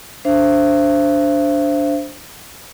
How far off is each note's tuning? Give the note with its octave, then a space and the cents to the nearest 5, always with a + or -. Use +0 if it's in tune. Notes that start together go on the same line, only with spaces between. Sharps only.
D4 -10 C5 +0 E5 +40